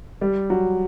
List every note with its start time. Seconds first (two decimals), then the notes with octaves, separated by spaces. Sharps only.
0.21 G3
0.50 F#3